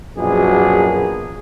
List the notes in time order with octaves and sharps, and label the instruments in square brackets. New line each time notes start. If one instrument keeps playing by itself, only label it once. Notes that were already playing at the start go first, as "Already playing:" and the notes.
[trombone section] A#1 F#2 B2 G#4